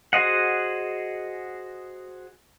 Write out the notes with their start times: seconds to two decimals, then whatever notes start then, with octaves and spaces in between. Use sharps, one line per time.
0.13 F#4 G#4 C5 D#5 F#5